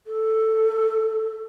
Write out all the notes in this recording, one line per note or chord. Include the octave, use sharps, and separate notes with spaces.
A4